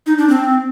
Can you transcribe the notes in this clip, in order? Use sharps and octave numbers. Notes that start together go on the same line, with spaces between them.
D#4
D4
C4